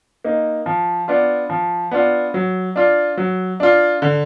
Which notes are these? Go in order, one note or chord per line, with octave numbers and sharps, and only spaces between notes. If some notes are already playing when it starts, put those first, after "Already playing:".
A#3 D#4
F3
B3 D4 F4
F3
B3 D4 F4
F#3
D4 F4
F#3
D4 F4
D3